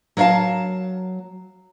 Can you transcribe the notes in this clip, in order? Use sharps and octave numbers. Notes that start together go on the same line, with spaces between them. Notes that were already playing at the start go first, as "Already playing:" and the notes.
F#3 A#4 D5 F5 A5